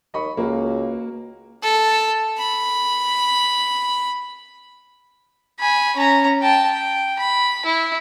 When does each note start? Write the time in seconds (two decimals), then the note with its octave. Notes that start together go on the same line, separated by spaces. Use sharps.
0.14 D#2 D#5 B5 C#6
0.37 C#2 A#3 F#4
1.62 A4
2.38 B5
5.59 G#5 B5
5.96 C#4 A#5
6.42 G5 A5
6.72 G5
7.19 B5
7.66 E4